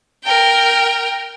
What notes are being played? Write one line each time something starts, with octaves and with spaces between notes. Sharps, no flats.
A#4 G5